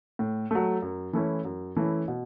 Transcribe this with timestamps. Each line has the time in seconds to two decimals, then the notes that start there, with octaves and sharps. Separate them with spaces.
0.19 A2
0.51 F#3 A3
0.82 F#2
1.13 E3 A3 C#4 E4
1.45 F#2
1.76 E3 A3 C#4 E4
2.08 B2